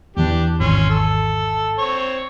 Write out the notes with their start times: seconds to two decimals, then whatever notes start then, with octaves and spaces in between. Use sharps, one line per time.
0.17 E2 E3 D4 G4
0.60 G#1 C#4 C6
0.90 A4
1.79 C4 C#5